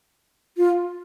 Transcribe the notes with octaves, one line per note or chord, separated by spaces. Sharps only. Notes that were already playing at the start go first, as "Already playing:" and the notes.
F4